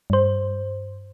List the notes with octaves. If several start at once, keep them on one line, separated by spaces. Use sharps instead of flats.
G2 C5